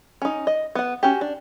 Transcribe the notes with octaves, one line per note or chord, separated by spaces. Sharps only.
C#4 D#4
D#5
B3 F#5
C#4 F#4 G4
D4